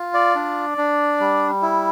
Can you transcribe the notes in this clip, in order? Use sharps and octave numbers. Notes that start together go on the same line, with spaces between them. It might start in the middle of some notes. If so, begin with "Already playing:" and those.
Already playing: F4
D5
D4
D4
G3
E4